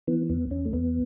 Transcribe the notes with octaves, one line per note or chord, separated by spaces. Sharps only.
E3 B3
E2 B3
E2 C#4
A3
E2 B3